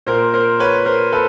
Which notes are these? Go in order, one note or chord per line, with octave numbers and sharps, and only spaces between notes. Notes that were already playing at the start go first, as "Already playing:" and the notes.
A#2 A#4 C5
A#4 C5
B4 C#5
A#4 C5
A4 B4